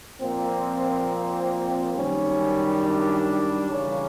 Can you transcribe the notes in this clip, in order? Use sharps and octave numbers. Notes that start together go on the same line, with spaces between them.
A#2 F3 A#3 C4
F#2 D#3 G3 C#4
D4
C#3 E3 G3 A#3 C#4